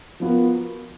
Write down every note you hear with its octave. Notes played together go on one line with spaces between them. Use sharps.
F3 B3 F#4 A#4